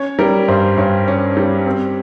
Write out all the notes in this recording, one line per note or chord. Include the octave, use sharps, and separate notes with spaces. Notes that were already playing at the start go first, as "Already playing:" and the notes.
Already playing: C#4 C#5
G3 A#4
G2 C5
G2 C#5
C#4
G3
C4